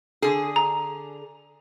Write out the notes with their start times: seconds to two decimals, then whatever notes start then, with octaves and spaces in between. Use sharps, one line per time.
0.22 D3 G#4
0.56 A#5